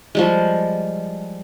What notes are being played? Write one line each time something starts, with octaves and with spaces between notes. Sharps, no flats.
F3 G3 G#3